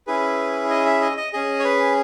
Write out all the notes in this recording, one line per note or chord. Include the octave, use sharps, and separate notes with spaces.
C#4 E4 G#4 B4
D#5
E5
D#5
D#5
C#4 G#4 D#5
C#5
B4